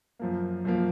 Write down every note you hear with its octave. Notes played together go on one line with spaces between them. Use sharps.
F#2 F3 A#3
F#2 F3 A#3